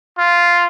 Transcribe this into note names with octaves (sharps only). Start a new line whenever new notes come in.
F4